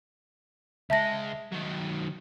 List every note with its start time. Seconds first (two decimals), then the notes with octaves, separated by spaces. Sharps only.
0.90 C#2 G#3 E5 A5 A#6
1.52 D#3 F#3